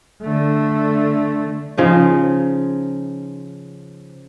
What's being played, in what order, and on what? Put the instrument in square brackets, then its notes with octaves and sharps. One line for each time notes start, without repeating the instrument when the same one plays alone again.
[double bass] D3 A3
[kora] C#3 F3 D#4